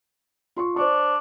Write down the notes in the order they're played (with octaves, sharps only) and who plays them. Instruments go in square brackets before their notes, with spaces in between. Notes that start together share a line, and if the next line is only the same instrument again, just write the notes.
[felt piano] F4 C6 C#6
[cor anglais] D4 [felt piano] C5 D5 C#6